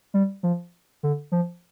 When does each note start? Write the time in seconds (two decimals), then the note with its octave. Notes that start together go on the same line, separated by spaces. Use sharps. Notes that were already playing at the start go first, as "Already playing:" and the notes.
0.14 G3
0.43 F3
1.03 D3
1.32 F3